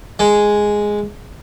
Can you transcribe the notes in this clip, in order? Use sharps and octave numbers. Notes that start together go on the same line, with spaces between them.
G#3